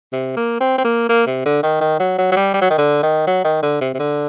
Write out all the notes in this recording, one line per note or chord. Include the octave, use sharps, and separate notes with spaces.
C3
A#3
C4
C4
A#3
A#3
C3
D3
D#3
D#3
F#3
F#3
F#3
G3
G3
F#3
D#3
D3
D#3
F#3
D#3
D3
C3
C3
D3